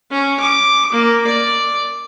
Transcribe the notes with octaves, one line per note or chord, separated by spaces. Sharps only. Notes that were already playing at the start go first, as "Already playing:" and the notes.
C#4
D6
A#3
D5